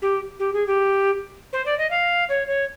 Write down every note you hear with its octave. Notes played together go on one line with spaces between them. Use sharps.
G4
G4
G#4
G4
C5
D5
D#5
F5
C#5
C#5